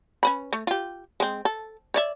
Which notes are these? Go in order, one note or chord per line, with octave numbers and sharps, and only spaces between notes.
C#4 B4 B5
A3
F4 G4
G#3 C4
A4
C#5 D5 E5